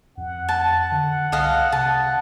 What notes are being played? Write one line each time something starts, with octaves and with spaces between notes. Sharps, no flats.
F2 F#5
A5
D3
C2 A4 D#5 F5
C3 A5